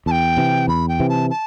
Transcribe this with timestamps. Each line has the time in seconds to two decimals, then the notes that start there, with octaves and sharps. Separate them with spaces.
0.06 E2 A5
0.11 G5
0.37 C3 E3
0.68 E2 B5
0.88 G5
1.00 C3 E3
1.09 A5
1.30 A5